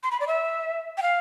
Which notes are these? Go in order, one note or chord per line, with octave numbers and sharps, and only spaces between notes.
C6
B5
D5
E5
G5
F5